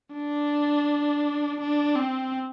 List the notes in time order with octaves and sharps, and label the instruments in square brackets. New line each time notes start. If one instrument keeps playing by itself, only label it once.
[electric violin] D4
D4
C4